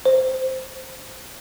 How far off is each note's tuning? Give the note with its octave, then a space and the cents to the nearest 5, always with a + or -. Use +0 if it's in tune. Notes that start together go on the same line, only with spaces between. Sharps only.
C5 -5